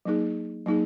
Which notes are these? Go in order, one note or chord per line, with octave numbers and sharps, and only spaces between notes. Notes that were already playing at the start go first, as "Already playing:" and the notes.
F#3 A#3 D#4 G#4
F#3 A#3 D#4 G#4